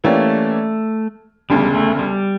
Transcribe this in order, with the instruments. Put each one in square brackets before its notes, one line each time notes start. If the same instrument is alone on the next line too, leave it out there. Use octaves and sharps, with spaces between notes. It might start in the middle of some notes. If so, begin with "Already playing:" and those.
[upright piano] E3 A#3 C#4 G4 D5 [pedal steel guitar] A3
[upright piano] E1 D2 C#3 [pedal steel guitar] G3
[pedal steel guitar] A3
G3